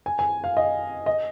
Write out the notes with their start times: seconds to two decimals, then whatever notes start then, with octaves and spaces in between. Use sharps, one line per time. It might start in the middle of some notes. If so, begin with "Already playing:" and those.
0.06 G#5
0.19 G#5
0.44 F5
0.57 D#5
1.06 D#5